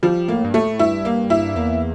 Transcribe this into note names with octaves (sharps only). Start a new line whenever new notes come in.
F3 G3
A2 A#3
G2
A2 A3
G2 E4
A#3
E4
E2 A#3